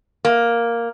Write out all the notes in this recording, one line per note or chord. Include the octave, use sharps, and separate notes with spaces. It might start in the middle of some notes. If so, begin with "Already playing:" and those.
A#3